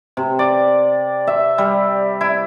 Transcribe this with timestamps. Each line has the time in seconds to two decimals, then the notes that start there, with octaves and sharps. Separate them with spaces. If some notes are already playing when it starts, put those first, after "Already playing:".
0.17 C3
0.39 D5
1.27 E5
1.58 G3
2.21 E4